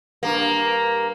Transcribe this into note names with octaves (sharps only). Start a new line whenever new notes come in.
G2 A#3